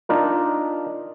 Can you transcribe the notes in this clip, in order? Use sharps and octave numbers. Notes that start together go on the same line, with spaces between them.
D4 D#4 F4 A#4